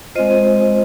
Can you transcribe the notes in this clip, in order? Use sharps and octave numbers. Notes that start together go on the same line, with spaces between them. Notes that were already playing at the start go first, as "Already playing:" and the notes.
G#3 C4 F4 C5 D#5